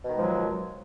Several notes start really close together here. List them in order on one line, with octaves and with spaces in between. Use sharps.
B2 D#3 G#3 F3 F#3